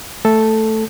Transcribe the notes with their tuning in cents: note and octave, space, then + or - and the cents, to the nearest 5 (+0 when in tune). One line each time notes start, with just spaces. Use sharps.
A3 +0 A4 +0